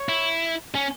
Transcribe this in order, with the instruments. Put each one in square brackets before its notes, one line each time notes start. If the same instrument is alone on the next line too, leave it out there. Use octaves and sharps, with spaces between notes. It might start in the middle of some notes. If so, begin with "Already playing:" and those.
Already playing: [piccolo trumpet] C#5
[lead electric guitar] E4
C#4